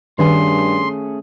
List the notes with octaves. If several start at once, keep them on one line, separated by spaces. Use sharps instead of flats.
G2 D#3 A3 C#4 G#4 C6